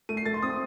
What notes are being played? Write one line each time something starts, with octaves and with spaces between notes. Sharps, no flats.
A3 D#7
C7
A3 A6
C6
C4 D#6